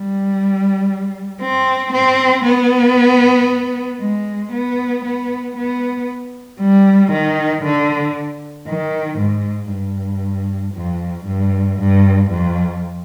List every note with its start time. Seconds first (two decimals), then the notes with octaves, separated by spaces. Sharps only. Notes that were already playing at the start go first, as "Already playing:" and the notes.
Already playing: G3
1.41 C4
1.93 C4
2.45 B3
4.00 G#3
4.53 B3
5.05 B3
5.57 B3
6.60 G3
7.12 D#3
7.64 D3
8.68 D#3
9.19 G#2
9.71 G2
10.74 F2
11.26 G2
11.79 G2
12.31 F2